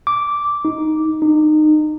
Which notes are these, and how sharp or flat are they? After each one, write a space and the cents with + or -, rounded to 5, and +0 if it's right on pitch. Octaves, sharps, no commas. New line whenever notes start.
D6 -5
D#4 +10
D#4 -25